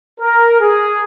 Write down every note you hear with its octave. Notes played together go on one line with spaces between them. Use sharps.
A#4
G#4